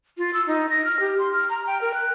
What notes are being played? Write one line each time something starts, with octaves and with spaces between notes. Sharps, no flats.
F4
E6
D#4
A#6
F6
G4
C6
F6
A#5
G5
A#4
F#6